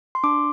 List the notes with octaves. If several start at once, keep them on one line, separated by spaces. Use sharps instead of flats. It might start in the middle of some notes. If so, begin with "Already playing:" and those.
C6
D4 D6